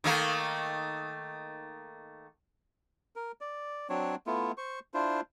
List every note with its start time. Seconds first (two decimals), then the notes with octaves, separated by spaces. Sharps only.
0.04 D#3 A3 A#3
3.16 A#4
3.41 D5
3.90 F#3 C4 D4 C#5
4.27 A3 B3 E4 F4
4.58 C5 C#6
4.94 D4 E4 F4 C5